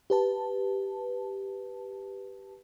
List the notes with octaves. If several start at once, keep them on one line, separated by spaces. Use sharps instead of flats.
G4 B4 A5